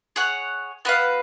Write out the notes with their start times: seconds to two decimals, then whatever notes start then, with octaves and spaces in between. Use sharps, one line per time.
0.16 G#4 C#5 F#5
0.85 B3 F#4 B4 F5